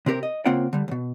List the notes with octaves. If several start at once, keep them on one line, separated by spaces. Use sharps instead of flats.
C3 C4 G4 A#4
D#5
C#3 A#3 C4 F4 F#5 G5
D3 G3
D2 B2